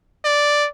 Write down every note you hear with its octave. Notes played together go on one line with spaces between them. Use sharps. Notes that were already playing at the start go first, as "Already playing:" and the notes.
D5